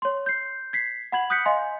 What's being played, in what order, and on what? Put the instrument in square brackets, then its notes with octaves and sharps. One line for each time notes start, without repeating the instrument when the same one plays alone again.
[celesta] C#5 C6
G6 C7
G#6 B6 C7
F#5 B5 G#6 F#7
D#6 F#6 G6 B6 C#7
D#5 F5 G#5 C6